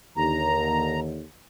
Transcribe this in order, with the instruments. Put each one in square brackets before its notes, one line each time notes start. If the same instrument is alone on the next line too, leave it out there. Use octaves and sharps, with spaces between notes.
[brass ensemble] D#2 D3 [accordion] A#5